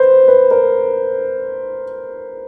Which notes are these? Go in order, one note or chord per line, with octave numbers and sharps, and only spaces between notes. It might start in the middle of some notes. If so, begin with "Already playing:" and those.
Already playing: B4 C5
B4
A#4